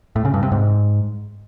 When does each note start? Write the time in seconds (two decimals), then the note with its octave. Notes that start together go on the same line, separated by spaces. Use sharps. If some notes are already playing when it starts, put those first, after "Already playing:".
0.16 A2
0.25 C#3
0.34 G2
0.43 C3
0.52 G#2